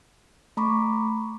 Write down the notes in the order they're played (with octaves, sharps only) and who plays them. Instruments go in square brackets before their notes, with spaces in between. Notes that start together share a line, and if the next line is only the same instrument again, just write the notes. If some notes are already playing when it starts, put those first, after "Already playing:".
[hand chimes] A3 A#5 B5 C#6 D6